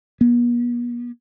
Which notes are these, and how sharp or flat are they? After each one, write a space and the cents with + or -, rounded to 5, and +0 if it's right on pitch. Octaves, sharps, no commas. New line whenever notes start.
B3 -45